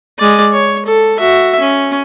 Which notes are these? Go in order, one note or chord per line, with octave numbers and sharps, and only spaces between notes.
G#3 D5
C#5
A4
F#4 E5
C#4